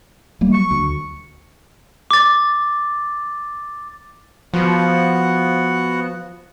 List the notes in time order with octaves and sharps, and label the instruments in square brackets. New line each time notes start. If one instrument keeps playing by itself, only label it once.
[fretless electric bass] F#3 G3 A#3
[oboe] C#6
[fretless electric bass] D2
[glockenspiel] D6 A6
[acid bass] F3 [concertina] B3 F#4 F#5